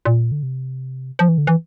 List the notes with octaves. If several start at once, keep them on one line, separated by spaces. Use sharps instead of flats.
A#2
D3
C3
F3
E3
D3
E3